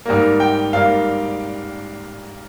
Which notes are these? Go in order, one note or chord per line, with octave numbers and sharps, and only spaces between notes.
G#2 G3 A#3
G5
G#2 G3 A#3 F5